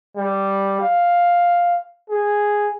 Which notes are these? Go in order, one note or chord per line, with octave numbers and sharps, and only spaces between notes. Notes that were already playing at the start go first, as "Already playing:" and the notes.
G3
F5
G#4